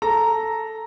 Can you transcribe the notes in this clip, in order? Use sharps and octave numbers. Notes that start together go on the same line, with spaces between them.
A4 A#5